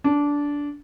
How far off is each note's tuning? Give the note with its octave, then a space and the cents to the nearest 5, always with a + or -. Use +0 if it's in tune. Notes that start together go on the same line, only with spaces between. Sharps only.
D4 -15